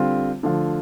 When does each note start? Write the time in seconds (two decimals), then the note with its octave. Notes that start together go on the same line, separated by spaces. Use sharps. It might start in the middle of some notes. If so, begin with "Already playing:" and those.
Already playing: D3 G3 C4 F4
0.43 D3 F3 A3 F4